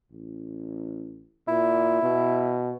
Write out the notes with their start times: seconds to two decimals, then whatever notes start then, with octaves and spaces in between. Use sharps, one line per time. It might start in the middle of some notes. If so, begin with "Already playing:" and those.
0.12 A1
1.48 A#2 E4
2.03 B2